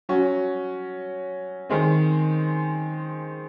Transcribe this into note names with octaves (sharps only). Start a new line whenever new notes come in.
F#3 C#4 F#4
D#3 G#3 C4